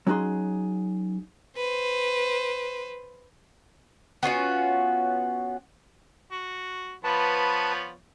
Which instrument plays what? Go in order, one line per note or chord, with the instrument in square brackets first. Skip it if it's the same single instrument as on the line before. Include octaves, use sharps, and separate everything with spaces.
[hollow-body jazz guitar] F#3 C#4 D#4 F#4 G#4 C6
[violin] B4 C5
[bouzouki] B3 C#4 F4 F#4
[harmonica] F#4
[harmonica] F3 B3 C#5 [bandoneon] B4 A5